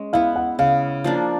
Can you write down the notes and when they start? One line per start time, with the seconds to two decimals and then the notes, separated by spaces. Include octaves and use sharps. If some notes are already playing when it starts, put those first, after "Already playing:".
Already playing: G#3 C#4
0.13 B3 E4 F5
0.36 F#5
0.59 C#3 F5
1.04 F3 A#3 D4